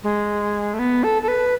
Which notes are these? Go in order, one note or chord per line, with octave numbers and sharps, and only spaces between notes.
G#3
A3
B3
A4
A4
B4